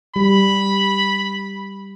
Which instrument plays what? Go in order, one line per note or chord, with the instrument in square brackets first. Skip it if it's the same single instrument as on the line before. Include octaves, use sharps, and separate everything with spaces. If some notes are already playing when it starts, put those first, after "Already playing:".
[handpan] G3 [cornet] B5